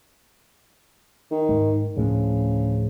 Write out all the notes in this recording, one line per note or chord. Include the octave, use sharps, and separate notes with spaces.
D#3
G#2 G#3
D2 A2 C#3 F3